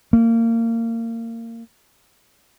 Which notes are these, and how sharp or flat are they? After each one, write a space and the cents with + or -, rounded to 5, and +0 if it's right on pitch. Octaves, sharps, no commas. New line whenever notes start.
A#3 -25